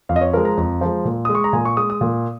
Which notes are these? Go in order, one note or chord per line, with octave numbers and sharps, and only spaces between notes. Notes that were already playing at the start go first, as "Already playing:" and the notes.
F2 F5
D#5
C#5
F3 G#3 A#4
A#5
F2
F3 G#3
A#2
G#3 D#6
C#6
A#5
A#2 G#5
C#6
G#3 D#6
D#6
A#2